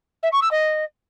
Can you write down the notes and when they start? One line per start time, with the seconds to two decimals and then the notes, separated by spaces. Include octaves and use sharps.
0.23 E5
0.32 C#6
0.42 E6
0.51 D#5